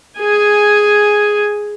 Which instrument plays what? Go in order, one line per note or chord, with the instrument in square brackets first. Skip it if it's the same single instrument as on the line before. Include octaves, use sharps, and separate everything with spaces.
[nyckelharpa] G#4 G#5